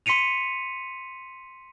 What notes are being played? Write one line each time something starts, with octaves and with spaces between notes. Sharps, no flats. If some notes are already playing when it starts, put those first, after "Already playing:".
C6 B6 C#7 D#7 F7